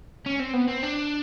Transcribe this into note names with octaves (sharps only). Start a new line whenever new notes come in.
C#4
C4
B3
C4
D4